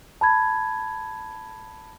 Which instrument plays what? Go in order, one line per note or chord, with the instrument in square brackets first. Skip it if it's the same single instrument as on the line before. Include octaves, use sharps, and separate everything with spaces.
[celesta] A5 B5 G#6